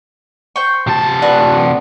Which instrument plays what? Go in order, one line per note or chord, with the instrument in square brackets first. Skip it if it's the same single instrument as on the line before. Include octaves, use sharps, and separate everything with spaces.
[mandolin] C5 G5 C#6
[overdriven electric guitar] C3 A5
[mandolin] D4 F#4 B4